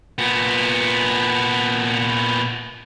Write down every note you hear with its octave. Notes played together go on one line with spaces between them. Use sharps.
A#2 B3